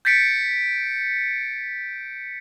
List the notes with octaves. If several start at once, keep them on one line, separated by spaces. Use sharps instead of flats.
G6 A6 B6 C#7 D7